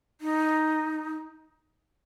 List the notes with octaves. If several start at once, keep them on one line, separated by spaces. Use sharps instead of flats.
D#4